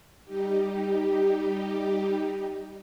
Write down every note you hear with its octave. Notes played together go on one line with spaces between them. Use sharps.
G3 D#4 G4